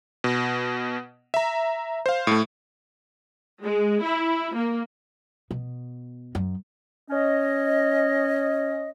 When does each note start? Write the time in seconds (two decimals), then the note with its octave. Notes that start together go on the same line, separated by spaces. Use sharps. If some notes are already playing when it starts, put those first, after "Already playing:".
0.24 B2
1.34 E5 A#5
2.06 C5 F5
2.27 A2 A3
3.64 G#3
4.03 E4
4.55 A#3
5.51 B2
6.35 F#2
7.09 C#4 D#5